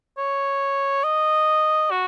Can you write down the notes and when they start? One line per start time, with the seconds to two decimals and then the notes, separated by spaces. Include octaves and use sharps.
0.17 C#5
1.04 D#5
1.91 F#4